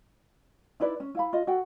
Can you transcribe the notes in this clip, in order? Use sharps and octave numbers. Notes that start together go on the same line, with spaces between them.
D#4 E4 B4 D5
C#4
E4 F5 B5
F4 D#5
F#4 A4 F#5 G5